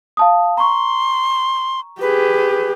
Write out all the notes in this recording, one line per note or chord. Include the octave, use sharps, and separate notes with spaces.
F5 A5 D#6
A#5 C6 C#6
G4 G#4 B4